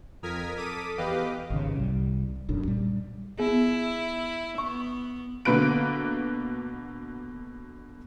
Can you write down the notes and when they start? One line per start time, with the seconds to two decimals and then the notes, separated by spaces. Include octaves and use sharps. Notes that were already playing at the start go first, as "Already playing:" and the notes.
0.23 F2 A#4 D#6 F6 G#6 B6
0.57 A4 D6 D#6 B6 D#7
0.97 E2 G4 B4 D#5 F5 D6
1.50 G#1 C#3
1.76 C2 G3
2.49 E1 B1 F#2 D4
2.68 A#2 G3
3.39 B3 E4 G#4
4.58 B3 C#6
5.45 B2 D3 A#3 B4 F#6 D7